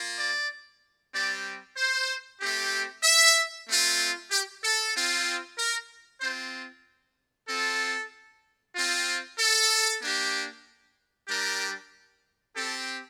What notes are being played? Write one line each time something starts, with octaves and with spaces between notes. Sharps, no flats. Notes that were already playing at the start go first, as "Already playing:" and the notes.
Already playing: A#3 F4
D5
G3 C4 G4 D5
C5
A3 C4 G4
E5
A3 C4 F4
G4
A4
C4 F4
A#4
C4 F4 C5
C4 F4 A4
C4 F4
A4
A#3 D4 G4
G3 D4 G4 A#4
C4 G4 A4